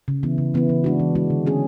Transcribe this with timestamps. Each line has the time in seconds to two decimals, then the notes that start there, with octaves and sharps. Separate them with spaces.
0.08 C#3
0.23 E3 B3 E4
0.38 C#3
0.54 E3 B3 E4
0.69 E3
0.84 G#3 D4 F#4
1.00 E3
1.15 G#3 D4 F#4
1.30 D3
1.46 A3 C#4 G#4